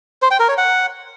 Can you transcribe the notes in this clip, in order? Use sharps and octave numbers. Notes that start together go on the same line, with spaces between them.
C5
G5
A#4
C#5
F#5